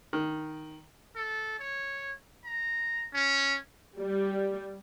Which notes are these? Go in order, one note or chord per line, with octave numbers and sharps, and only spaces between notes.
D#3
A4
C#5
A#5
C#4
G3